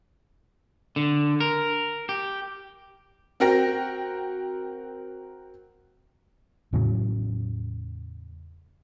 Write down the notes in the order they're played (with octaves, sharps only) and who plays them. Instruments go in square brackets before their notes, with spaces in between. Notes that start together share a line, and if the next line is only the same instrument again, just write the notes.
[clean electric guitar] D3
A#4
G4
[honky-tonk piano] C4 F#4 A#4 G5 A#6
[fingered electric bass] E2 A2 C#3 F#3